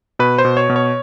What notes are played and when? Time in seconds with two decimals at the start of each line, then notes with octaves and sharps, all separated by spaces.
0.19 B2 B4
0.38 C5
0.45 B2
0.57 C#5
0.70 B2
0.76 C#5